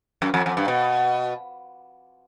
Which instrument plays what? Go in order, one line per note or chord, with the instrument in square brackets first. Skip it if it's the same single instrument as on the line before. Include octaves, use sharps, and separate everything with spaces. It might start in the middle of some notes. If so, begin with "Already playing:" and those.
[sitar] F#2
F2
F2
G2
B2